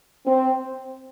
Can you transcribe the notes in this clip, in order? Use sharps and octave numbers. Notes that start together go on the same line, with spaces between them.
C4